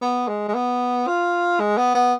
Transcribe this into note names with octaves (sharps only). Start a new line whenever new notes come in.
B3
G#3
G#3
B3
F4
G#3
B3
B3